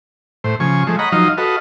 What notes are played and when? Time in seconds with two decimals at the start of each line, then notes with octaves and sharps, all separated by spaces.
0.44 A2 C5
0.60 C#3 F3 G#5 C#6
0.87 F3 G#3 A3
0.99 C#5 D#5 F#5 A#5 B5
1.12 F3 F#3 D#4 D#5 F5
1.38 F#4 A4 B4 D#5 F5